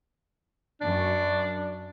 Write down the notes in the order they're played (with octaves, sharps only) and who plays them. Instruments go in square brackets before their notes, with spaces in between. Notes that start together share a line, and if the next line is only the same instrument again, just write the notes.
[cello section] F#2 [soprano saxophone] D4